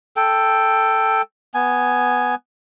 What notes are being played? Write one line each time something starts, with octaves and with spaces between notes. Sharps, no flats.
A4 G5
B3 G#5